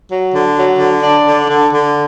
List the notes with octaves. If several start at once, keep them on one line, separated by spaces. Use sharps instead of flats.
F#3
D3
F#3
D3
D4
D3
D3
D3